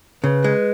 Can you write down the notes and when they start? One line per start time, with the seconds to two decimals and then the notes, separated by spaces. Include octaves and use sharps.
0.23 C#3 B4
0.44 G#3